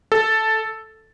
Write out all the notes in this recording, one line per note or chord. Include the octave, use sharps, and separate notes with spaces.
A4